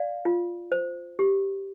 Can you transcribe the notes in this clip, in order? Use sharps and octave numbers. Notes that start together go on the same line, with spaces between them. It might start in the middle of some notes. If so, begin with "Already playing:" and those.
Already playing: D5 F5
F4
C5
G4